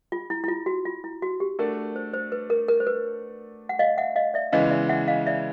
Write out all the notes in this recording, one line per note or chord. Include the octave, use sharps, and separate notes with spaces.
F4
E4
E4
F4
F#4
F4
E4
F#4
G4
A3 D4 F#4 A4 A#4 D5
C5
C5
B4
A#4
A#4
C5
B4
F#5
D#5 F5
E5 F#5
D#5 F5
D5 E5
C#3 E3 G#3 B3 D#5 F5
D5 E5
E5 F#5
D#5 F5
D5 E5